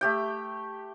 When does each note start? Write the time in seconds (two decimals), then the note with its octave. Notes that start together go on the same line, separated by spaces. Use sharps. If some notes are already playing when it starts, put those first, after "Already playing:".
0.01 A3 G4 G5